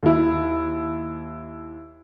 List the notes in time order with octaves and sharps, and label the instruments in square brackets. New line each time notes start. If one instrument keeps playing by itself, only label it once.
[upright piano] D#2 E4